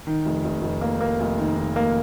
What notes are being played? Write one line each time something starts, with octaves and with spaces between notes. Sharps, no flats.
D#3
F1
F1
F1
A#3
A#3
F1
D#3
D#3
A#3